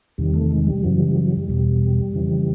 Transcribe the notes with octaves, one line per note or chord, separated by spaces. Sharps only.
E2 C3 D#3 G3
A3
G#3
G3
F#2 C#3 E3 F#3
G3
F#3
G3
E2 B2 G3
F2 C#3 E3